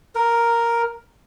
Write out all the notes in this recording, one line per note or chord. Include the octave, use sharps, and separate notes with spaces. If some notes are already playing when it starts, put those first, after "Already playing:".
A#4